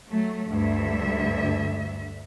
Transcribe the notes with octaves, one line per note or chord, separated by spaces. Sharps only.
F#3 A3
D2 G2 E5